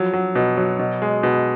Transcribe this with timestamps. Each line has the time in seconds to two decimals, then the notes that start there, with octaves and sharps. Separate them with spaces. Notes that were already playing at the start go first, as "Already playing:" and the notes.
Already playing: F3 F#3
0.13 F#3
0.35 B2
0.57 F#3
0.79 B2
1.02 G#3
1.23 B2